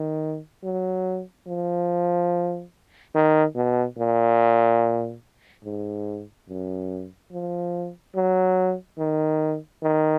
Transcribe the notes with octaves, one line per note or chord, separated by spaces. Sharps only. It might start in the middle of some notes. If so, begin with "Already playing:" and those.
Already playing: D#3
F#3
F3
D#3
B2
A#2
G#2
F#2
F3
F#3
D#3
D#3